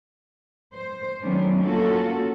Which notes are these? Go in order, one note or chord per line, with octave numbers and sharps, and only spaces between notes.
C5
D#3 F#3 A3 B3 C#4 D4
A#3 C#4 F4 F#4 A4